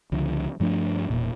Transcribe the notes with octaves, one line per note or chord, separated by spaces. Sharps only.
C#2 D3 F3
G2 F3 A3 D4
E1 A#2